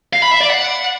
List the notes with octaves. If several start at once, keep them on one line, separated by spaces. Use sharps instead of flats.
F5
B5
E5
D5
F#5